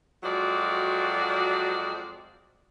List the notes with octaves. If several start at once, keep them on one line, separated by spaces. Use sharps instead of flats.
F2 F#3 G#3 F#4 D5